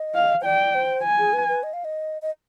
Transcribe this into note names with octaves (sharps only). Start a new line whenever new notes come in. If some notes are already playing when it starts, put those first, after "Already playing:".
Already playing: D#5
F5
C5
D5 G5
C5
G#5
G#4
B4
B4
D#5
F5
D#5
D#5